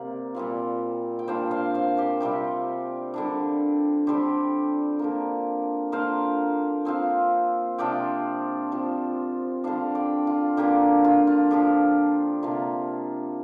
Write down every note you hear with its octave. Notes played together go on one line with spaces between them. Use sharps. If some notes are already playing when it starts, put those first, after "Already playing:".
Already playing: C3 A#3 D5
A#2 G3 C4 F4
G5
A#2 G3 D4 C5 F5
C5 F5
C5 F5
G4 C5
C3 G3 C4 F4 G4
D3 G3 D4
D3 G3 C4 G4 C5
D3 F3 A#3
D3 A#3 F4 C5 F5
F3 C4 F4
C3 F3 D4 F4 D5 G5
F3 C4 F4
D3 G3 D4 C5 F5
D5 G5
F4
D3 A#3 D4 F4 G4
F4
F4
D3 F3 D4 F4 G4
C3 A#3 D4 F4